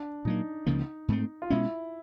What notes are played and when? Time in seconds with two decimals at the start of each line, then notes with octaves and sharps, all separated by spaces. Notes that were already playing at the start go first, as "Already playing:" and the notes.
Already playing: D4
0.25 A#2 F#3 A#3 D#4
0.66 C#2 C#3 F3 A#3
1.08 G#2 F3 A3 C4
1.42 F4
1.50 B2 G#3 C#4 E4